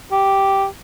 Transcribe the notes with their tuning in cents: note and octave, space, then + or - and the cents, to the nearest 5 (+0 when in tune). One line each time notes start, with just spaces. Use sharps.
G4 -5